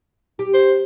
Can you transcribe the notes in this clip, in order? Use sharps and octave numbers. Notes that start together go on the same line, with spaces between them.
G4
C5